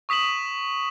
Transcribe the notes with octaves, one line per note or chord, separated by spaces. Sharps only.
C#6 D#6 B6 E7 F#7